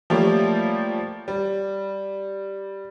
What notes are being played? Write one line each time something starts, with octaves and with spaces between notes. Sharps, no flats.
F3 G3 A3 A#3 G4 C#5
G3